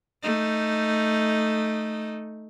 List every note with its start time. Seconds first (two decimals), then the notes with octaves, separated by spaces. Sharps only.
0.23 A3 D#4